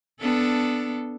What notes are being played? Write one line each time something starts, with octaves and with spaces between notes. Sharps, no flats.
B3 D4 A4